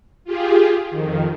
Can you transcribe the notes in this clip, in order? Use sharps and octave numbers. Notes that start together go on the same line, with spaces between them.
F4 G4 G#4
F2 D#3